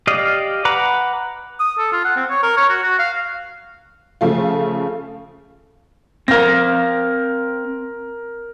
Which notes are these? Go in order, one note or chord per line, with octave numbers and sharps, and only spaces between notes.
G4 D5 D#5 F5
B4 F#5 A#5 B5 D6
D#6
A4
F4
F#5
C4
C#5
A#4
C#5
F#4
F#4
F5
C#3 F3 A3 F4
C4 A#4 F5 A#6